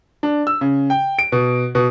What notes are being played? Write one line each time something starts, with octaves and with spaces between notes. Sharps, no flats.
D4
E6
C#3
G5
D7
B2
B2